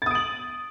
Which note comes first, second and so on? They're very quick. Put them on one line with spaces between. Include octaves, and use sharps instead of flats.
A6 D#6 D7 F#7